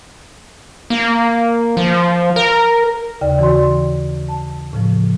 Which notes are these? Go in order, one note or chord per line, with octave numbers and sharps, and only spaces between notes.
A#3
F3
A#4
D#2 C#3 D5 G5
E3 F#4 C#5 D5 C6
A5
A2 C#3 F3